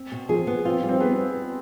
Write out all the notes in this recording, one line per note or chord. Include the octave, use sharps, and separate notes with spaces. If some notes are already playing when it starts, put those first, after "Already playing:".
Already playing: C4
B2
F3 G#4
B3
C4 F4
G3
C4
B3 G#4